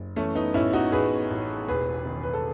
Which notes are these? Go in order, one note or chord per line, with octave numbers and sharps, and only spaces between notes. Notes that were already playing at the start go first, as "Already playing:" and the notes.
Already playing: F#1
E3 A3 C#4
B3 D#4
A1 C#4 E4
D#4 F#4
A1 G#4 B4
A1
E1 G#4 B4
D#3
B4
A4